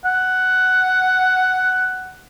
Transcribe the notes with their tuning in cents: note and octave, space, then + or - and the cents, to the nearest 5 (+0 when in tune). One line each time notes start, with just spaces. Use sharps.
F#5 +5